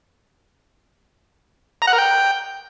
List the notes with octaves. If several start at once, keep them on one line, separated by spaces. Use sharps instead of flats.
A#5
F#5
A#4
G5